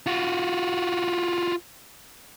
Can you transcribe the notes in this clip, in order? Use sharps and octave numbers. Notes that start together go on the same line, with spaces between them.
F4 F#4